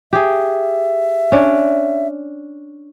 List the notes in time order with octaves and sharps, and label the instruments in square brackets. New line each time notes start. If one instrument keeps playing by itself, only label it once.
[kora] G4 G#4 [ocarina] E5
[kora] C#4 D4